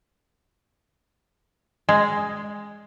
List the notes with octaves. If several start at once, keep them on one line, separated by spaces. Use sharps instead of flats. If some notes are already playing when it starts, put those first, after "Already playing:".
G#3